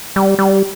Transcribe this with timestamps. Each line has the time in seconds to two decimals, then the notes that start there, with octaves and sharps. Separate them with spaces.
0.16 G3
0.39 G3